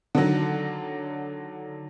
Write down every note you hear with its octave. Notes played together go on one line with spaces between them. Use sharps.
D3 D#3 F#3